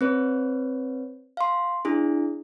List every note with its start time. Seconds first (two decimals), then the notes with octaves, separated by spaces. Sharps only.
0.01 C4 B4 C#5
1.37 F5 C6
1.85 D4 E4 G#4